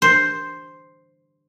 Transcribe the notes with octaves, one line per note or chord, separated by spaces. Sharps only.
C5